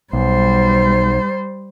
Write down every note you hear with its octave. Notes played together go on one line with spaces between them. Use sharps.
B1 G3 C5